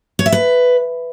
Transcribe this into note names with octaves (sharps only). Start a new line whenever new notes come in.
C#5
E5
B4